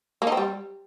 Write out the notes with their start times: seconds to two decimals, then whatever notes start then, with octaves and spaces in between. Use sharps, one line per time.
0.22 A#3
0.27 D#4
0.32 C4
0.37 G3